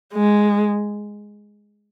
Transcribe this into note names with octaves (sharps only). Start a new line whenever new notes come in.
G#3